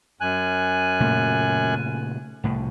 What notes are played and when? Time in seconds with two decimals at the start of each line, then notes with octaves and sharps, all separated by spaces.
0.21 F#2 G#5 F#6
1.00 A#2 C#3 A3
2.44 C2 A2